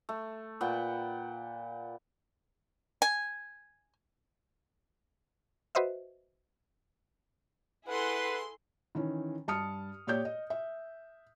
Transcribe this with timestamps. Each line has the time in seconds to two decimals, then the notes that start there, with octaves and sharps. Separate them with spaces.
0.09 A3
0.61 A#2 B4 F#5 G5
3.02 G#5
5.75 F#4 B4 C5 D#5 E5
7.88 E4 G#4 A4 B4 F#5 C6
8.95 D#3 E3 C#4
9.48 G2 A5 D#6 F6 C#7
10.07 A#2 G4 C#5 D5 G6
10.25 D#5
10.50 E5